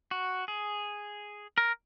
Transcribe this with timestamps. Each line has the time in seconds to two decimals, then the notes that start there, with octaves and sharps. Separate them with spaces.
0.11 F#4
0.48 G#4
1.58 A#4